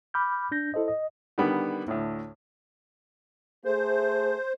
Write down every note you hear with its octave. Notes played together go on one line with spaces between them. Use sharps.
B5 D6 F6 G6
D4 G6 A#6
E4 A4 C5 D#5
D#5
D3 D#3 G3 B3
D2 A2
A3 G#4 C5